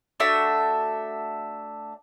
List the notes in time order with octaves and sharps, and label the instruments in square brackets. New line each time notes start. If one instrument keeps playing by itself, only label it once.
[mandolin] A3 D4 F#4 E5